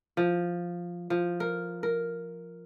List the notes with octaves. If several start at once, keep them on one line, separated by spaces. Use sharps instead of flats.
F3
F3
A#4
A#4